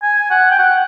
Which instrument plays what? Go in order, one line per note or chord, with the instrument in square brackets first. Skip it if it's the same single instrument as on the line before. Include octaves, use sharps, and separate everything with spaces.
[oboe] G#5
F#5
G5
F#5